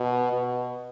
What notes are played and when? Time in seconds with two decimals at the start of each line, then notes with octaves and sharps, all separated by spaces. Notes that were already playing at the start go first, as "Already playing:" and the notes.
Already playing: B2
0.32 B2